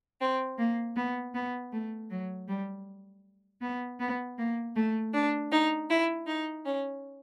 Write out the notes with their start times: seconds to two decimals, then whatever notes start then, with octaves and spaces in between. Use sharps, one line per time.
0.20 C4
0.58 A#3
0.96 B3
1.34 B3
1.72 A3
2.10 F#3
2.47 G3
3.61 B3
3.99 B3
4.37 A#3
4.75 A3
5.13 D4
5.51 D#4
5.89 E4
6.26 D#4
6.65 C#4